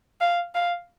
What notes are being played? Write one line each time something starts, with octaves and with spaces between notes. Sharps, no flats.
F5
F5